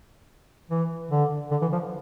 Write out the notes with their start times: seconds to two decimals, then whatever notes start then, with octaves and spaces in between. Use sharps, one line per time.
0.70 E3
1.11 D3
1.51 D3
1.62 E3
1.72 F3